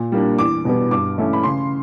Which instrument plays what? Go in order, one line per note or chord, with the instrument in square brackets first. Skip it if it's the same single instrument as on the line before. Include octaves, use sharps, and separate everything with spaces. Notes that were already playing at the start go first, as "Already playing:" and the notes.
Already playing: [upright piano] A#2
G3 A#3 D4
E2 D6
B2 G3 B3
G2 D6
E3 A3 C#4 E4
B5
C#3 C6